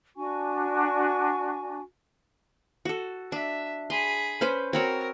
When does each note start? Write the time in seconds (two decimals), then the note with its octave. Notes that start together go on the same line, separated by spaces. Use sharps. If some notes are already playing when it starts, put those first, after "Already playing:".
0.17 D4 F#4 G#5 C#6
2.85 F#4 A4
3.32 D4 E5
3.90 G#4 B5 C6
4.41 C#4 B4 C5
4.73 C4 F#4 A#4 C#5